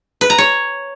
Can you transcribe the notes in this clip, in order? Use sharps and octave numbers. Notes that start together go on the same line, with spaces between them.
B4
A#5
C#5